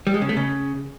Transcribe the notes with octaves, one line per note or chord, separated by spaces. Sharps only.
G3
G#3
C#3
A3
C#3